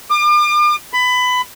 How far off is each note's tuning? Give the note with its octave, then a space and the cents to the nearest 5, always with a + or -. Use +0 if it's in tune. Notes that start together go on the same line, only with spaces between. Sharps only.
D6 +40
B5 +20